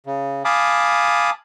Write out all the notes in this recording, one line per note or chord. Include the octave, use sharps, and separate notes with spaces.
C#3
F5 G#5 A5 B5 D6 D#6